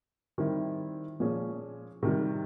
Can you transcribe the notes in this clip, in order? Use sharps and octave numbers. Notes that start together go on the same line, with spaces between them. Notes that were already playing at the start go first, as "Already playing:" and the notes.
D#3 G3 C4 E4
A#2 F3 G#3 C#4
C3 D#3 G3